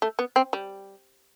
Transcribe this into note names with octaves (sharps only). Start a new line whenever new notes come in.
A3
B3
C4
G3